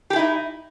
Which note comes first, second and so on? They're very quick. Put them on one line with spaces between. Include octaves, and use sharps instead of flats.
G4 G#4 E4 D#4